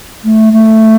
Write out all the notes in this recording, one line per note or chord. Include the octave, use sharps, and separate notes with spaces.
A3
A3